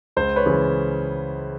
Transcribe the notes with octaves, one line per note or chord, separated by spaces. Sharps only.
C#2 C5
B4 C#5
C#3 E3 G#3